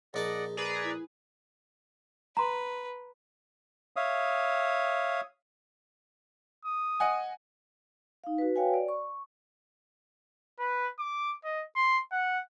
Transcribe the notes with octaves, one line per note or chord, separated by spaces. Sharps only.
A#1 D#4 G#4 D5 D#5 F#5 A5
G#4 B4 D5 A#5
E4
B4 A#5 C6
C#5 E5 F5 D#6
D#6
D#5 F#5 G#5
D#4 F5
F#4 B4
F#4 B4 C#5 F5 G5 G#5
D5
C#6
B4
D6
D#5
C6
F#5